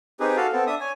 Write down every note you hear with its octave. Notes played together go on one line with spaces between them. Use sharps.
C4 D#4 G4 G#4 B4
F#4 A4 F5
B3 C4 A4
D4 E5 D#6
C#5 G#5